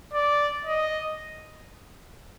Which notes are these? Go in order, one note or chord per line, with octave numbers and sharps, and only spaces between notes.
D5
D#5